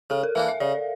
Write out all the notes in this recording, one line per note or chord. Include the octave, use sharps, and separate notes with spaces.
C#3 A4
A#4
E3 A#3 D4 F5
E5
C#3 D5